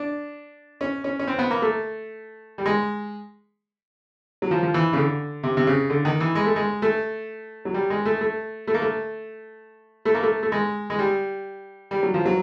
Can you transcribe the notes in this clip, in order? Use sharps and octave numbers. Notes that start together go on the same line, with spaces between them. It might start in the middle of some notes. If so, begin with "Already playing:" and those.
Already playing: D4
C#4
C#4
C#4
C4
B3
A#3
A3
G3
G#3
F#3
F3
F3
E3
C#3
D3
C3
C3
C#3
D3
D#3
E3
G#3
A3
G#3
A3
F#3
G3
G#3
A3
A3
A3
A#3
A3
A3
A#3
A3
A3
G#3
G#3
G3
G3
F#3
F3
F#3